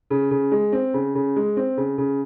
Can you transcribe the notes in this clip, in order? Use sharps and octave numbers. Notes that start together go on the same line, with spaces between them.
C#3
C#3
G#3
C4
C#3
C#3
G#3
C4
C#3
C#3